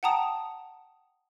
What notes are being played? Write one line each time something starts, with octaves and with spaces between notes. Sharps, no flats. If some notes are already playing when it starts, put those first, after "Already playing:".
F#5 G5 A5 A#5 D#6